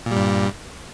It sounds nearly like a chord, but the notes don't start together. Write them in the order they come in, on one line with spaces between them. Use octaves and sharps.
A#2 G3 G2